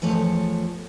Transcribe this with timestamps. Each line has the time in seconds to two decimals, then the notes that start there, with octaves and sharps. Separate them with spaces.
0.02 E2 F3 A3 C#5